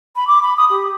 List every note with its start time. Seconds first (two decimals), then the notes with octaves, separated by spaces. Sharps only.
0.16 B5
0.27 D6
0.42 B5
0.57 D#6
0.70 G4